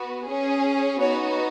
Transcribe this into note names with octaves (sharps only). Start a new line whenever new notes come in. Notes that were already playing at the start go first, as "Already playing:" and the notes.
Already playing: B3 F#4
C#4 G#4
B3 D#4 F#4 C#5